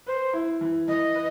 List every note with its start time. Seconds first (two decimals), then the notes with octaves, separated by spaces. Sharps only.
0.06 B4 C5
0.33 E4
0.61 E3
0.88 E3 D#5
1.15 B4